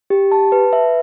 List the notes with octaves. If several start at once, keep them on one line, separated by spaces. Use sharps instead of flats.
G4
A5
B4
E5